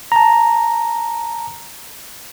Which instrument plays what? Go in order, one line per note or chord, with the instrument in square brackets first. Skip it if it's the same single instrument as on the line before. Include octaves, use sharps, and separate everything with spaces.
[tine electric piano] A5 A#5